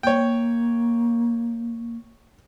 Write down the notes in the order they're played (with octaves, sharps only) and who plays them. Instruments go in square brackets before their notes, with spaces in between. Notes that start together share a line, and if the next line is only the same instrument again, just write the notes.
[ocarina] A#3 [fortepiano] C#5 G5